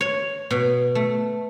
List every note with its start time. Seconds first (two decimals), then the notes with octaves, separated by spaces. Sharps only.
0.01 C#5
0.51 B2
0.95 A3